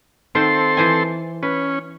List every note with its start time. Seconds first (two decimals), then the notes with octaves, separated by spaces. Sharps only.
0.35 D#3 C4 F4 A4 C5 C6
0.77 E3 C5 G#5
1.43 C#4 B4